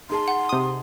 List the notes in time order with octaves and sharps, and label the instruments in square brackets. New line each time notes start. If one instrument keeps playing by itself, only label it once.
[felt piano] D#4 G#4 A5 [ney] C6
[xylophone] F#5
[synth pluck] C3 D#6